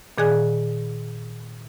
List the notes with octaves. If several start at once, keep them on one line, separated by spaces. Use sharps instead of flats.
A#2 D#3 G#4 D5 G#5 F#6